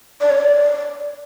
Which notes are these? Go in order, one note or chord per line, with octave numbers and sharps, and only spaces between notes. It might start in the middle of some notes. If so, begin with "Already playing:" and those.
D5
C#5
D5